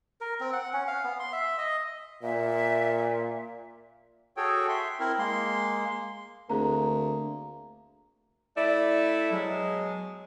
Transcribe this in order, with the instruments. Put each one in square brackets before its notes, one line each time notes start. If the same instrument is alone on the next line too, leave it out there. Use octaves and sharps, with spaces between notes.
[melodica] A#4
C4
F#5
C#4
F5
B3
C6
E5
D#5
[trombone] A#2 [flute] E5
[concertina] F#4 G#4 A4 C#5 G5
E5 C6
C4 E4 A#4
G#3 A#3 C6
[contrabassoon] D2 [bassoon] A#3 [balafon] C4 G#4 [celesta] A#5
[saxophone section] A3 E4 [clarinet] D5
[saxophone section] B2 G#3 [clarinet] F#3